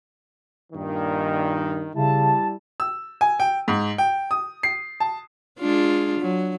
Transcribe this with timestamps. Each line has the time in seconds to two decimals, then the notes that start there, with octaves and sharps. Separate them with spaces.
0.73 G2 A#2 D#3
1.95 C#3 G3 E4 A5
2.80 E6
3.21 G#5
3.40 G5
3.68 G#2
3.98 G5
4.31 D#6
4.63 C7
5.00 A5
5.60 G#3 D4 F4
6.19 F#3